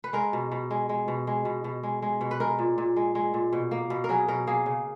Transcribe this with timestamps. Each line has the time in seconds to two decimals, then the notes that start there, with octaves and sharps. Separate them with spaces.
0.04 B4
0.13 G#3 A#4
0.33 B2
0.51 B2
0.71 G#3
0.89 G#3
1.08 B2
1.27 G#3
1.45 B2
1.64 B2
1.83 G#3
2.02 G#3
2.21 B2
2.31 B4
2.40 G#3 A#4
2.59 A#2
2.78 A#2
2.96 G#3
3.15 G#3
3.34 A#2
3.53 B2
3.71 A#3
3.90 B2
4.04 A#4
4.09 F#3 G#4
4.28 B2 A#4
4.47 A#3 G#4
4.66 C#3